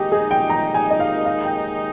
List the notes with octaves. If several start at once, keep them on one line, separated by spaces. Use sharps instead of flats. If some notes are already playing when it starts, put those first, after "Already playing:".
Already playing: D#2 D#3 G#3 D#4 G4
G#4
G5
A#5
G#5
D#5
F5
F5
G5